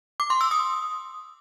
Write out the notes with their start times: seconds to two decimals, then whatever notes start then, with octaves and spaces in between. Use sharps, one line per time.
0.20 D6
0.30 C6
0.41 E6
0.51 D#6